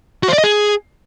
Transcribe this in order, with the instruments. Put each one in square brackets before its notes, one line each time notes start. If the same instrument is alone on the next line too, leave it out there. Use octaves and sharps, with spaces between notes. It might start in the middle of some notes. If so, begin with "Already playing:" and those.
[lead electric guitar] F#4
C5
D5
D#5
G#4